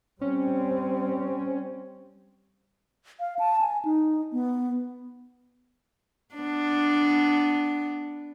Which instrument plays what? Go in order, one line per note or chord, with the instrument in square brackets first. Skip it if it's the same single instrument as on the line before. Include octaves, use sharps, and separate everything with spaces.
[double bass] G3 C4 [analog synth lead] C#4
[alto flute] F5
A5
G#5
D#4
B3
[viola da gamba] B3 D4